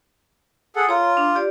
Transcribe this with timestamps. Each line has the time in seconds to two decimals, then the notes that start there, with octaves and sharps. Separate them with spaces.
0.76 G#4 A4 F#5
0.89 F4 C#5 A#5
1.17 D4
1.36 G4 D5